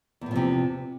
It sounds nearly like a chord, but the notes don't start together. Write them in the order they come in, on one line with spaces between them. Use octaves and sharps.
E2 A2 F3 C3